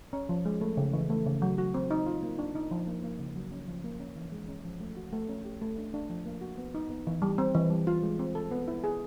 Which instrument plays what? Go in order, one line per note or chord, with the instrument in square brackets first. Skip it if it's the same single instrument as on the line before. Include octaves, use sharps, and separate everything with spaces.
[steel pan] C#4
F3
G#3
A3
C#3
E3
A3
C#3
F#3
F#4
C4
D#4
F4
A#3
D4
D#4
F3
A#3
A#3
C#3
F#3
C#4
F3
A#3
C#4
E3
G#3
C#4
F3
A3
F#4
A3
C#4
G4
A3
D4
D4
F3
A#3
F#4
B3
D#4
B3
E3
G3
C4
E3
G3
F4
G#3
C4
A4
B3
E4
G#4